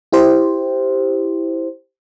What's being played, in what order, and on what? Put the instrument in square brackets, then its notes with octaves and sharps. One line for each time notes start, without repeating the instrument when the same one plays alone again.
[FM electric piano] E4 G4 C5